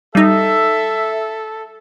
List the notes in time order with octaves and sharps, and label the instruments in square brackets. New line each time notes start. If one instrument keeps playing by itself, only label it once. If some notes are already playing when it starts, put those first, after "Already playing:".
[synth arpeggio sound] G3 D#4 [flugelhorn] A4 [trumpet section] E5